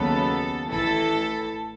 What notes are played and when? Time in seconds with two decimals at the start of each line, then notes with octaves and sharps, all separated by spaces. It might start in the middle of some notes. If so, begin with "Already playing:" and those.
Already playing: D#2 C#3 F#3 B3 A4
0.68 A1 A2 E3 A4